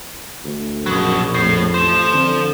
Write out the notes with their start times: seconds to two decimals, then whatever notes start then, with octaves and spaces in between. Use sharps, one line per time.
0.44 D2
0.86 A#1 F#2 B2 F#3 B5
1.34 F2 A2 C7
1.74 A1 F3 C5 E7
2.13 D3 C4